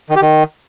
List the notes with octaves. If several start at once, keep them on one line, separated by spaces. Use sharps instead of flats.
D#3
G4
D#3